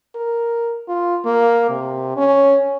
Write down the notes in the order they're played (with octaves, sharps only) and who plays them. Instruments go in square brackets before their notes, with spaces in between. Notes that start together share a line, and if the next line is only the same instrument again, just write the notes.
[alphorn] A#4
F4
A#3
C3
C#4